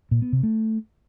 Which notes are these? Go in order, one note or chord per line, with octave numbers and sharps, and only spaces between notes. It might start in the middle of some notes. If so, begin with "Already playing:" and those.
A#2
B3
C3
A3